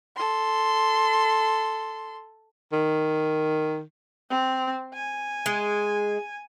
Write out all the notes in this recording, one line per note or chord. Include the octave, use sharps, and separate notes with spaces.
A4 C6
D#3
C4
G#5
G#3